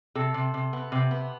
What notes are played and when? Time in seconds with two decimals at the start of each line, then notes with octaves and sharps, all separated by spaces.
0.15 C3 A4
0.34 C3
0.54 C3
0.73 B3
0.92 C3
1.11 B3